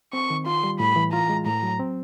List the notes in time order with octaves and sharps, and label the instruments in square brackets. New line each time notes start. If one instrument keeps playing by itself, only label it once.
[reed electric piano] C4 [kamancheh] C#6
[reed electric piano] D#3
[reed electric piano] F4 [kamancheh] C6
[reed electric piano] G3
[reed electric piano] A2 [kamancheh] B5
[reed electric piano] E3
[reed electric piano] F4 [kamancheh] A#5
[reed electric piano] G#3
[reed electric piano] A2 [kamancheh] A#5
[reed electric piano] F#3
C4